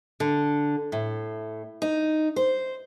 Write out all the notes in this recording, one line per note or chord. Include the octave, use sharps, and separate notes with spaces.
D3
A2
D#4
C5